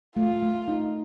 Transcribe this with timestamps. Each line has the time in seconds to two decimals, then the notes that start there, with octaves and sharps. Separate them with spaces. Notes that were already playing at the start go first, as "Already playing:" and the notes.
0.16 A3 F4
0.42 A3
0.68 D#4